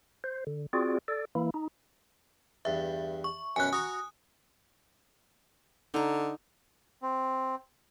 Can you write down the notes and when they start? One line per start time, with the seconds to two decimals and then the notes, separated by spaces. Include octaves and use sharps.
0.24 C5
0.47 D3
0.73 C4 F4 F#4 G#4 D5
1.08 A4 D5
1.35 E3 A#3 E4
1.54 D#4
2.65 E2 G2 E5
3.24 C#6
3.56 F#2 B2 C#4 G#5 F#6
3.73 F#4 A#5 C#6 D#6
5.94 D3 D#4 A#5
7.02 C4